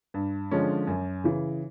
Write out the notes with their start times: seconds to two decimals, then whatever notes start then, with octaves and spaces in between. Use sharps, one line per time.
0.14 G2
0.51 D3 F3 G#3 C#4
0.87 F#2
1.24 C#3 E3